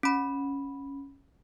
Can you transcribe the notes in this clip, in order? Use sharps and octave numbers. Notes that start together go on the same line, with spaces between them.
C#4 B5